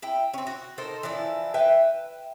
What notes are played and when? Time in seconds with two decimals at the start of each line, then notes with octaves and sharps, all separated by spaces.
0.02 E4 G5
0.34 C4 C#4
0.47 F#4
0.78 D#4 A4 A#4 C5
1.03 E3 F3 D4 E4
1.54 B4 E5 G5